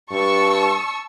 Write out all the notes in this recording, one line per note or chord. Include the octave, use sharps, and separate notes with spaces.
G2 A5 C#6 E6